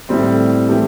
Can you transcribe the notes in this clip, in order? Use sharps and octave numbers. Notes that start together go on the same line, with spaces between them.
A2 G3 C4
E3 A3 D4 G4